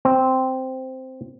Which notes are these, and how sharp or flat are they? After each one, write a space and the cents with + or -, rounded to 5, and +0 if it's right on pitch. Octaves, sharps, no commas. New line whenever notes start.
C4 -5